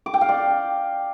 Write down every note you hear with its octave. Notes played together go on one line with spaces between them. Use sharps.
D6
G5
F5
D5